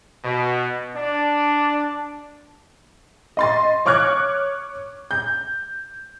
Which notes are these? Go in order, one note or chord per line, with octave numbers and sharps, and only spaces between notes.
B2
D4
D#5 C6 A6
C#5 C#6 D6 F6 F#6 G#6
G6